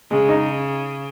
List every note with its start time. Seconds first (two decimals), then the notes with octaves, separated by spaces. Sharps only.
0.11 C#3 G#3
0.29 D#4